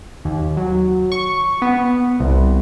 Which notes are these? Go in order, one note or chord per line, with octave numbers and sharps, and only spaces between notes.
D#2
F#3
C#6
B3
C2